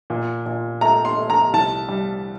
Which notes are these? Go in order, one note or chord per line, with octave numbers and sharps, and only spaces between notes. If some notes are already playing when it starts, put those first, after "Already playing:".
A#2
A#2
A3 A#5
C6
A3
A#5
C2 A5
G3